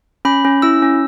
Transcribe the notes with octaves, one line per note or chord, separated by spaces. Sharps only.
C#4 B5
C#4
E4 E6
C#4